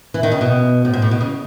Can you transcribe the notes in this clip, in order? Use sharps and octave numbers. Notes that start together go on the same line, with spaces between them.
E3
D#3
C#3
B2
A2
G#2
A2
B2
C#3